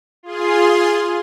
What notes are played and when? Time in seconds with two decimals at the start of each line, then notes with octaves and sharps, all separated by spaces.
0.23 F4 G#4 C6